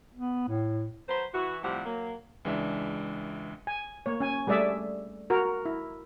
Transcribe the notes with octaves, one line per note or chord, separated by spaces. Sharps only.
B3
A2
F#3 B4 C5
E3 F#4
A2 C3 F3 G3 F#5
F#3 A#3
C#2 E3 G#3 D4 E5
G#5
A#3 C#5
C#4 G#5
G3 A3 G#4 D5 E5
F#4 A#4
E4